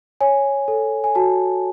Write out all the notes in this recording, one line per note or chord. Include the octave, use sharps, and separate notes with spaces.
C#5 G#5
A4
G#5
F#4 A5